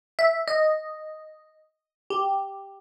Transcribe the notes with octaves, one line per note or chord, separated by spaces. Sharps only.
E5
D#5
G4